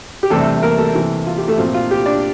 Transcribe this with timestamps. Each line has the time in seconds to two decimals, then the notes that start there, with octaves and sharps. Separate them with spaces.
0.23 G4
0.30 E2 C3 G3 A3 D4 A4
0.62 A#3 A#4
0.79 A3 A4
0.94 C3 E3 A3
1.27 F4
1.38 G4
1.48 A3 A4
1.58 A#2 F3 C4 F4
1.74 F4
1.91 G4
2.06 D4 D5